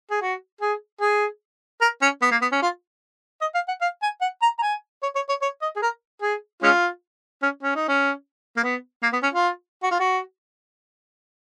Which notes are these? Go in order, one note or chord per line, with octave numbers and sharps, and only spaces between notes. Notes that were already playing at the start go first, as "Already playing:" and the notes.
G#4
F#4
G#4
G#4
A#4
C#4
B3
A#3
B3
C#4
F4
D#5
F5
F#5
F5
G#5
F#5
A#5
A#5
G#5
C#5
C#5
C#5
C#5
D#5
G#4
A#4
G#4
G#3 C#4 F4
C#4
C#4
D#4
C#4
A#3
B3
A#3
B3
C#4
F4
F#4
F4
F#4